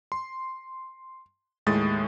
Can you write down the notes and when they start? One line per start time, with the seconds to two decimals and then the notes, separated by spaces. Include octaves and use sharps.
0.12 C6
1.66 D#2 A2 G#3 D#6 A6